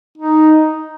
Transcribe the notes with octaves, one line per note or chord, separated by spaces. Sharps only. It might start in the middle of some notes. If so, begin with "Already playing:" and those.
D#4